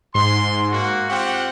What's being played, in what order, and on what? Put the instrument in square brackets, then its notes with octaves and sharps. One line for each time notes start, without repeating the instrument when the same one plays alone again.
[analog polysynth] G#2 [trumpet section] C6
[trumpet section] A#3 F#4
[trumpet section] C4 F4 G4 [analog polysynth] F#5